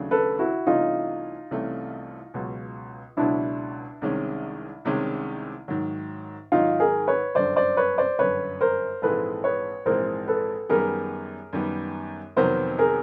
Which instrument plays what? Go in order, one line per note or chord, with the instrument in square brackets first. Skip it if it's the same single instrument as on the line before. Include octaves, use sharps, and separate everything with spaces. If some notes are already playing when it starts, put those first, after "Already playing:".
Already playing: [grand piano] D#2 C#3 F#3 A3 D4
[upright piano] A4 B4
E4 F#4
[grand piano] C2 C3 E3 A3 C#4 [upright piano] D#4 F4
[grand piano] C2 C3 E3 A3 C#4
C#2 B2 F#3
[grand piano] C#2 B2 F#3 [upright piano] D4 E4
[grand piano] C2 C3 D#3 G#3 C#4
C2 C3 D#3 G#3 C#4
G#2 D#3 F#3
[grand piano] G#2 D#3 F#3 [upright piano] D#4 F4
[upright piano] G#4 A#4
B4 C#5
[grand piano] G1 F#2 D3 [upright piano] C5 D5
[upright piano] C5 D5
B4 C#5
C5 D5
[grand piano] G1 F#2 D3 [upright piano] B4 C#5
[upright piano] A#4 C5
[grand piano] A#1 G#2 E3 G#3 C4 [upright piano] A4 B4
[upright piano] B4 C#5
[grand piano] A#1 G#2 E3 G#3 C4 [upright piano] A#4 C5
[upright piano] A4 B4
[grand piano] F#2 D#3 G3 B3 [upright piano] G#4 A#4
[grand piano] F#2 D#3 G3 B3
[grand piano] F2 C3 D#3 F#3 B3 [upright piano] A#4 C5
[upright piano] G#4 A#4